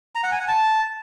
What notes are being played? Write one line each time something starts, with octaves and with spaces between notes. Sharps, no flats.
A#5
F#5
G#5
F#5
A5